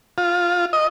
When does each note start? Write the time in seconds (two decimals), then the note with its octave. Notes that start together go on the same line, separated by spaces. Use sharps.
0.18 F4
0.73 D#5